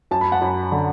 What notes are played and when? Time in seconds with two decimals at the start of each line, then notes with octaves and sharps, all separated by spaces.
0.11 F#2 A5
0.21 B5
0.32 F#5 A5
0.41 F#2
0.72 D3